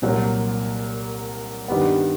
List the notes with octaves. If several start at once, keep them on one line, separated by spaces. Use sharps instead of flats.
C2 A#2 F#3 A#3
G2 D#3 G3 B3